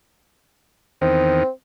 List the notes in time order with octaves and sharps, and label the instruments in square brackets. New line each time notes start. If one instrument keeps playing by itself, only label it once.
[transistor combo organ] E2 D#3 [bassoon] C4